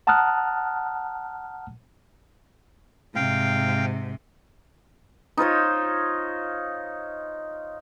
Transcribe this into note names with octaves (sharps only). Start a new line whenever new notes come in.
F#5 A5 A#5 D#6 F6 F#6
G#2 C3 F5 G5
D#4 F4 C5 C#5